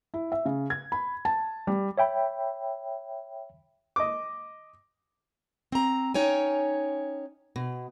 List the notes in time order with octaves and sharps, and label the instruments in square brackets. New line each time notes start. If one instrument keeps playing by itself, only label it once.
[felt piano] E4
E5
C#3
G#6
B5
A5
G3
[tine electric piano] C#5 E5 G5 B5
[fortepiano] D#5 D6
[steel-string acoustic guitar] C4 A#5
C#4 D#4 C#5 G5 G#5
B2